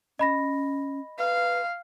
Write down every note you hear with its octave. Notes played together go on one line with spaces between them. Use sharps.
C#4 D#5 B5 A#6
B4 F5